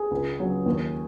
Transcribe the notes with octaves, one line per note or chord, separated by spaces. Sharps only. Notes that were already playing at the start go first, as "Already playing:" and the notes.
Already playing: G#4
C#2
C#3 F#3
D#2